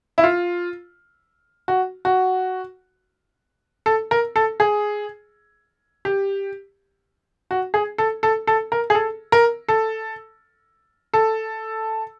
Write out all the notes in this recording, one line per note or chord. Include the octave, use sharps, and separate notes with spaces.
E4
F4
F#4
F#4
A4
A#4
A4
G#4
G4
F#4
G#4
A4
A4
A4
A#4
G#4
A4
A#4
A4
A4